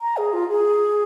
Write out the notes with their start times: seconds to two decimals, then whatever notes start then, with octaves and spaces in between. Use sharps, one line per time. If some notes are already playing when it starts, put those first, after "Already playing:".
0.01 A#5
0.17 G#4
0.33 F4
0.50 G#4